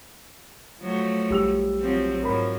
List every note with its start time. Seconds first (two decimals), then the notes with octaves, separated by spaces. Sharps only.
0.81 F3 F#3 A3
1.30 A#1 G3 E6 F7
1.79 F3 F#3 C4
2.23 G#2 F3 F#3 A#4 B5